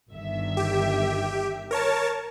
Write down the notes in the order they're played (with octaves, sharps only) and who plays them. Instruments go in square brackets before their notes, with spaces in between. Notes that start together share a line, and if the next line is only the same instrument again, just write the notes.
[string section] G1 D#3 E5
[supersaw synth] G4
A#4 C#5 A5